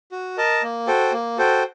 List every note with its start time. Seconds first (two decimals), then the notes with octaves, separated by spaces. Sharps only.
0.12 F#4
0.37 A#4 D#5 A5
0.63 A#3
0.87 F#4 A4 C5 G5
1.13 A#3
1.38 F#4 A4 C5 G5